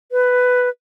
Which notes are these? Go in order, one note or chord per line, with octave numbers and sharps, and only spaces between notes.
B4